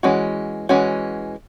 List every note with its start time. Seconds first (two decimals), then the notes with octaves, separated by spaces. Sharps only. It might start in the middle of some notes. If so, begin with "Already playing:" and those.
0.03 E3 G#3 C#4 F#4
0.69 E3 G#3 C#4 F#4